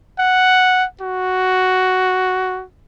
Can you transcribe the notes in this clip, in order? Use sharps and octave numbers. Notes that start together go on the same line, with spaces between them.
F#5
F#4